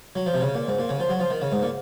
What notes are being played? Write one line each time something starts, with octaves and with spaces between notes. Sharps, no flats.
F#3
F3
C3
C#3
A#2
G#2
A#2
C#3
F3
F#3
F3
D#3
C#3
G#2
A#2